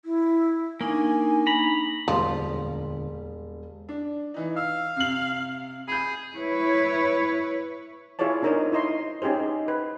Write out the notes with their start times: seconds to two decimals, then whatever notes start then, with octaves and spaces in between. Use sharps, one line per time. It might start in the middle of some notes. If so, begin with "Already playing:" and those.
0.05 E4
0.81 A#3 D4 D#4 G#5 C#6
1.47 A#5 B5
2.08 E1 D2 A#2 F3 G3
3.89 D4
4.34 E3 D#4
4.56 F5 E6
4.96 C3 F#7
5.88 G#4 B5 G6
6.35 E4 B4 C#5
8.19 E4 F4 G#4 C#5 D5 A5
8.42 D4 D#4 A#4 C5 C#5 D#5
8.72 E4 C5 D#5 A#5 C6
9.22 C#4 D#4 G4 G#4 C5
9.68 B4